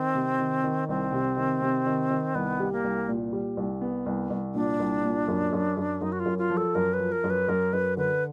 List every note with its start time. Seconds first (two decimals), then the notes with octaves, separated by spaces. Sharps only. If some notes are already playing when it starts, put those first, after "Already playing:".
Already playing: D#3 C4
0.15 C3
0.39 D#3
0.64 D#3
0.88 C2 C4
1.13 C3
1.37 D#3
1.62 C3
1.86 D#3
2.10 D#3
2.35 C2 B3
2.60 G3
2.72 A#3
2.84 C2
3.08 A#2
3.33 G3
3.57 C2
3.81 B3
4.06 C2
4.30 C2
4.55 A#2 D4
4.80 C2
5.04 A#2
5.28 F#2
5.53 F#2
5.77 F#2
6.01 F#2 D#4
6.12 F#4
6.20 F4
6.26 F#2
6.38 F4
6.50 F3
6.57 A4
6.75 F#2 A#4
6.93 B4
7.00 F3
7.12 A#4
7.24 F#2
7.30 B4
7.48 F#2 A#4
7.73 F#2 B4
7.97 D3 B4